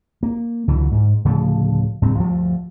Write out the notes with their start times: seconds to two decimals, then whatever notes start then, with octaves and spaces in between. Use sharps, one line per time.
0.23 A#3
0.68 C#2 D3 E3 F#3
0.91 G#2
1.25 D1 C#3 F3 A3
2.02 D1 G2 C#3 C4
2.16 D2 G2 F3